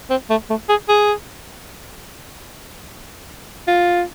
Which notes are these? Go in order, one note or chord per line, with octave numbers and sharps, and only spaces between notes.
C4
A3
A3
G#4
G#4
F4